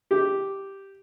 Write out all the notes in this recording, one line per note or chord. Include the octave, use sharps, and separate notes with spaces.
G4